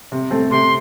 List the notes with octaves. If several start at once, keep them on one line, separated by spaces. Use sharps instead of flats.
C3
A3 C4
C3 C6